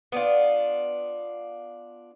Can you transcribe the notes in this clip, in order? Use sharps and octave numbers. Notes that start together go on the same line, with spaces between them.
B3 D4 F4